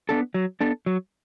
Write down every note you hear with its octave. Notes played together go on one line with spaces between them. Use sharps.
B3 D4 A4
F#3
B3 D4 A4
F#3